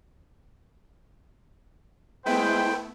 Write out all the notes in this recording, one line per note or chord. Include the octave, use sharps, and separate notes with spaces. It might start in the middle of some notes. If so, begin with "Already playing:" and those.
G#3 A3 B3 E4 B4 C5 G5